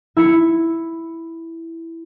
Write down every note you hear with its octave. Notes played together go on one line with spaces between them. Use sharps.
E4 C#7